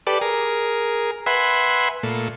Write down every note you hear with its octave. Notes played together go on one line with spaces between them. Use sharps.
G4 A4 B4 D5
G#4 A#4
B4 E5 F#5 G#5 B5 C6
A#2 A3